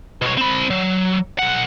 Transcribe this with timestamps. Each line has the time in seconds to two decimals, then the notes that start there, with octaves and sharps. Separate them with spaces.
0.22 B2 C#5
0.37 C4 B5
0.70 F#3
1.39 B1 F#5